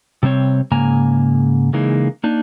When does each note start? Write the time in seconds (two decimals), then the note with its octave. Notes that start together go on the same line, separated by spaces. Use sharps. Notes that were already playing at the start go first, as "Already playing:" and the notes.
0.23 C3 G3 C4 C#5
0.71 G#2 C#3 A#3 G#5 A#5
1.73 C#3 E3 G#3 A#3 D#4
2.24 A#3 D4 D#4